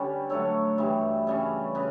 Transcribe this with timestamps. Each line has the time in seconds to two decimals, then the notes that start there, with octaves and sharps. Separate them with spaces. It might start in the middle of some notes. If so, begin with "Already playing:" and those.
Already playing: D3 G3 C#4 G4 B4
0.29 D3 F#3 A3 A4 C#5
0.78 G2 E3 G3
1.27 C#3 G3 C#4
1.75 C#3 B4